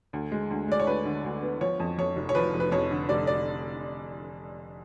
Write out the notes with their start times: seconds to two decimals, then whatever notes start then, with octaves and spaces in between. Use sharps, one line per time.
0.13 D2
0.32 G#3
0.50 D2
0.68 G#3 D5
0.80 C#5
0.87 D2 B4
1.05 D3
1.25 D2
1.43 B3
1.61 F3 C#5
1.80 F2
1.98 F2 C#5
2.16 F1
2.29 C#5
2.35 F3 B4
2.54 F1
2.60 B4
2.72 F2 C#5
2.91 D3
3.09 F1 D5
3.27 D5